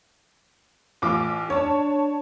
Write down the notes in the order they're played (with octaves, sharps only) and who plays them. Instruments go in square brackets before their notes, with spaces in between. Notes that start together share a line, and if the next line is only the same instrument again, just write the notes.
[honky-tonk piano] A1 F4 D6
[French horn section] D4 [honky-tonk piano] C#5 A5